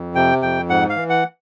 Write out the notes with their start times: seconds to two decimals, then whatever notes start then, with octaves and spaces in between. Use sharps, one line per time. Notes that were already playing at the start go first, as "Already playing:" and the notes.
Already playing: F2
0.15 C3 G5
0.42 F2 G5
0.69 G#2 F#5
0.90 F5
0.96 E3
1.10 F#5